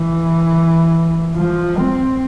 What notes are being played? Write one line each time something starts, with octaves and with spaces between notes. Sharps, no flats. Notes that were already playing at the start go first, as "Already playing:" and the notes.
Already playing: E3
F3
C4